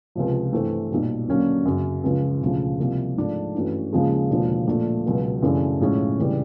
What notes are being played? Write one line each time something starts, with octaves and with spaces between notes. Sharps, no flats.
C#2 C3 F3
G2 E3 A3 C4
B1 A#2 G3
D#2 D3 F#3 A#3 C#4
F#2 C#3 F#3
C#2 C#3 F3
E1 D2 C#3 F3
C2 C3 F3 A#3
G#2 F3 A3 D4
G2 E3 A3 C#4 F#4
D#2 C#3 F3 G#3
E1 D#2 D3 F3
A#2 F3 A3 D4
C#2 B2 F#3 B3
F#2 C#3 E3 A3 D4
B1 A2 F3 G#3 C#4
F1 C#3 E3 G3